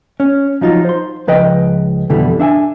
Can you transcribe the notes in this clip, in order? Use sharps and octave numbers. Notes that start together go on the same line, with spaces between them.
C#4
F3 F#3 D#4 F4
C5 C6
C#2 F3 B4 D#5 G5
F2 B2 D3 E3 G3
D4 E5 F#5 G#5